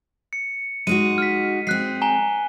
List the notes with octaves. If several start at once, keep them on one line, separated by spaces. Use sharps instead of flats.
C#7
G#3 D#4 F#4 D#7
F6 B6
G#3 C4 F#6 C7
G#5 A#5 G7